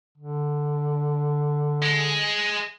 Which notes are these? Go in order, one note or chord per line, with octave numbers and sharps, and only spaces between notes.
D3
G#3